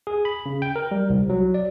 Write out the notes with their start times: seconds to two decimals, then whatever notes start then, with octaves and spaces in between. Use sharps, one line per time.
0.07 G#4
0.25 B5
0.46 C#3
0.62 G5
0.76 A#4
0.91 G3
1.10 C2
1.29 F#3
1.54 D5